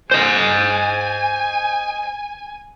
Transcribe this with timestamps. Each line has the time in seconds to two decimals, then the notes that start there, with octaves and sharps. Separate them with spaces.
0.11 C5 D#5 G#5